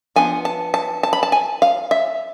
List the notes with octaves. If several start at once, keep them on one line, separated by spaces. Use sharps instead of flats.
F3 B3 D4 G#5
A5
A5
A5
B5
A5
G#5
F5
E5